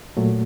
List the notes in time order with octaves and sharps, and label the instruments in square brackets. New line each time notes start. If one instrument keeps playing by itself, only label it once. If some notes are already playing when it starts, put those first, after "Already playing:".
[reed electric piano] A#2 F#3 A3